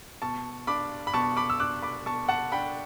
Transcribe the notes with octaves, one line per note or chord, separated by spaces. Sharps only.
B2 A5 C#6
D4 B5 D6
B5
B2 A5 C#6
B5 D6
E6
D4 D6 F#6
B5 D6
B2 A5 C#6
F#5 A5
D4 G5 B5